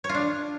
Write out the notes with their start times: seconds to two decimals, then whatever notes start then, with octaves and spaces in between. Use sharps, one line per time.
0.04 C#5
0.09 F4
0.14 D4